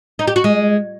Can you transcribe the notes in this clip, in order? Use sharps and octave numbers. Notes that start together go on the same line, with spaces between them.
D#4
G4
F#4
G#3